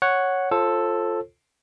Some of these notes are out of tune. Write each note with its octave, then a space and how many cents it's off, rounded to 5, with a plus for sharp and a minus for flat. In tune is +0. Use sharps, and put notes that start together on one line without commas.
C#5 +0 F#5 +0
F4 +0 A4 +0 C5 +35